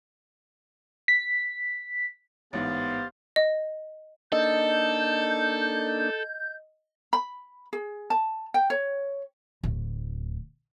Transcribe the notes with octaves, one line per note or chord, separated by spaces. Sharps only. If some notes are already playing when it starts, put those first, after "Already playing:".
B6
A1 G#2 B3 G4 C5 F5 A6
D#5
A#3 D4 D#4 A4 D#5 G6
B5
G#4
A5
G5
C#5
D1 D2